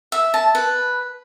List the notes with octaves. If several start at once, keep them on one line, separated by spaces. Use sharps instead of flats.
E5
A5
B4